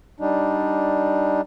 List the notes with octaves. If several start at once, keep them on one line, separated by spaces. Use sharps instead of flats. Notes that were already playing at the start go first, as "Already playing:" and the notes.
G3 D4 D#4